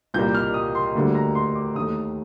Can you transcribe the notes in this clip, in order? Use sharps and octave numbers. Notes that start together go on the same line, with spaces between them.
C2 A#2 G3 A#3 G6
F6
D#6
C6
D2 D3 G3 A#3
A#5
C6
D6
D#2 D#3 A3 D#6